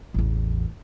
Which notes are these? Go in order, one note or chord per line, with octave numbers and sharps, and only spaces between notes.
A1 E2